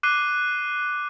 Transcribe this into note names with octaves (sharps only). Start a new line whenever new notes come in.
D6 F#6 C7 D#7 G7